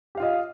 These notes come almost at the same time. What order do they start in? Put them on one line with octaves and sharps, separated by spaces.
G4 F5 F4 D#5